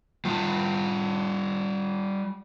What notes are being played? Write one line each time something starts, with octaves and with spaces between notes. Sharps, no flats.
G3 F4